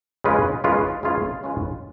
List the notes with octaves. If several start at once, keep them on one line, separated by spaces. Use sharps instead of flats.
C#3 G#3 C#4 F4 B4
C#3 G#3 C#4 F4 B4
C#3 G#3 C#4 F4 B4
C#3 G#3 C#4 F4 B4